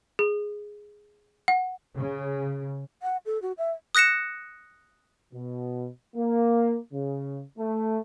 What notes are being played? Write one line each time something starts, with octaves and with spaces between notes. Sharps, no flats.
G#4
F#5
C#3
F#5
A4
F#4
E5
D#6 F#6 A#6 C#7 E7
B2
A#3
C#3
A3